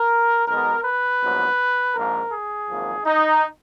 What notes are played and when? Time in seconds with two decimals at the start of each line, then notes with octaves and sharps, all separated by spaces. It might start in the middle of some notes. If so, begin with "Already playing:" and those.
Already playing: A#4
0.47 B1 B2 G#3 B3 A#4
0.84 B4
1.21 A#1 G#2 F#3 B3
1.94 A#1 G#2 F3 A#3 A#4
2.32 G#4
2.68 G#1 F#2 F3 A#3
3.05 D#4